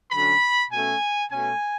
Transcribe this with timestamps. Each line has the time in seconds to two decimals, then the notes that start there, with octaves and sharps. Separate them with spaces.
0.12 D3 F#3 C#4 B5
0.71 B2 A3 C#4 G#5
1.31 B2 A3 C#4 G#5